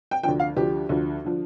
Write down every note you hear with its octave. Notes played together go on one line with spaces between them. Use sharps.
G5
D2 D3 F3 G5
F5
D2 D3 F3 G4
D2 D3 F3
D3 F3